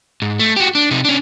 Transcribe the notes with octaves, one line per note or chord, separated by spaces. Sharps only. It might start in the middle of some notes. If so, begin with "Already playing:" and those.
G#2
A3
F#4 G4
D4
C3 D#4
C#4 D4